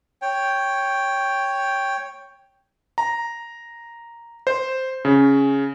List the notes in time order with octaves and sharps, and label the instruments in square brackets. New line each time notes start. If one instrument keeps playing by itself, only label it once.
[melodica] C#5 G5
[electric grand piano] A#5
C5
C#3